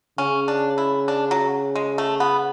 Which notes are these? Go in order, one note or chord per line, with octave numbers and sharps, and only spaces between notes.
C#3 C#4
D4
E4
D4
F#3
G#3
A3
B3